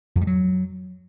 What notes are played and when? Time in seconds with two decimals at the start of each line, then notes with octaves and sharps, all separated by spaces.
0.16 F2
0.21 G3
0.27 F#3